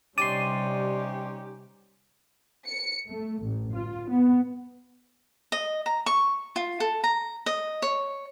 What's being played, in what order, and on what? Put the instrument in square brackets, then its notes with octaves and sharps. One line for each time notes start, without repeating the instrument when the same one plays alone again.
[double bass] C3 G3 [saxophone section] C#4 D#4 G4 [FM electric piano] D5 C6 [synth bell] D#7
[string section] C#7
A3
A1
F4
B3
[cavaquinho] D#5
A#5
C#6
F4
A4
A#5
D#5
C#5